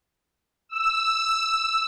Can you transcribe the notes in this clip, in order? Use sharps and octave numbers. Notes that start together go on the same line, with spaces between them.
E6